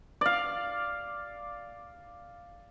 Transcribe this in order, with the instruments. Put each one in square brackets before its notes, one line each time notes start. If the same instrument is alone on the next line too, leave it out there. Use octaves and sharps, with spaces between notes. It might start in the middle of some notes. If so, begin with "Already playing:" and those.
[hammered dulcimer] D5 F5